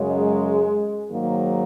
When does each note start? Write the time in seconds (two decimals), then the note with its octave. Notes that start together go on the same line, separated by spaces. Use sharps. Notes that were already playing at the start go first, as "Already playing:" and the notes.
Already playing: F#2 C#3 F#3 G#3
1.11 G#2 D#3 F#3 A#3